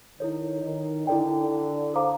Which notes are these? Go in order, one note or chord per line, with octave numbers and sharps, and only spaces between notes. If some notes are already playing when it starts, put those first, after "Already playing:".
D#3 E4 A4 C#5
D#3
D3 E4 A4 D5 G5
A4 C5 F5 A#5 D6